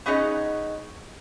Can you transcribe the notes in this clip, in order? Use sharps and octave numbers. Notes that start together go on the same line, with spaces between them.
B3 C#4 D#4 G#4 C#5 D#5